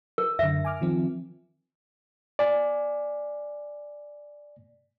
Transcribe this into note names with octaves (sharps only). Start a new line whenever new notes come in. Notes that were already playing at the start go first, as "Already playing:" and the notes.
A#4
F#2 D3 E5
G#5 D6 F6
D#3 F3 C4
D5 G#5